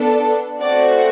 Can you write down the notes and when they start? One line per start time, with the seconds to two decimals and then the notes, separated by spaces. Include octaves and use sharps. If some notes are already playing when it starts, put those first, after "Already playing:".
Already playing: B3 D4 A4
0.62 A3 C4 F#4 D5